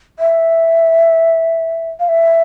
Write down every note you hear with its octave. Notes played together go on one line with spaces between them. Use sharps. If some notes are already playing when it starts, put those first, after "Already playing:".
E5
F5
E5